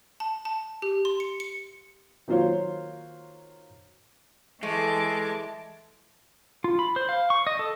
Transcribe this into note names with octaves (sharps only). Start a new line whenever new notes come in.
A5
A5
G4
C6
C#7
C#7
D#3 F#3 A#3 F4 C5 C#5
E3 G#3 A3 A5 D6
F4
B5
C5
F5
C#6
D#5
A4